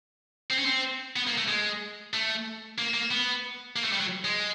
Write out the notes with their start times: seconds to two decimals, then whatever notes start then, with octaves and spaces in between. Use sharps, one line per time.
0.50 C4
0.58 C#4
0.66 C4
1.16 B3
1.27 A#3
1.38 A3
1.48 G#3
2.14 A3
2.78 A#3
2.94 A#3
3.11 B3
3.76 A#3
3.84 A3
3.92 G3
4.00 F#3
4.25 G#3